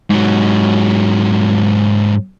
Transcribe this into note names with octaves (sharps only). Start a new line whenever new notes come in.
G#2 F#3